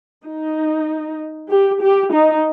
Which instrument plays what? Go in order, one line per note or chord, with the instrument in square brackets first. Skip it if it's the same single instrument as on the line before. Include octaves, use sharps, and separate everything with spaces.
[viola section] D#4
G4
G4
D#4